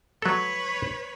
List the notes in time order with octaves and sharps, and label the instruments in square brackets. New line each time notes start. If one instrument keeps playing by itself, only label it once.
[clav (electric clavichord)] F#3 A4 [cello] B4 C#5